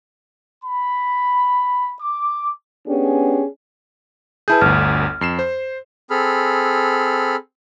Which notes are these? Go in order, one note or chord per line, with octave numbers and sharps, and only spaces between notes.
B5
D6
B3 C#4 D4 G4 G#4
E4 G#4 B4 A5 G6
G1 D2 F6
F2 C7 E7
C5
C4 G#4 A4 B5 F6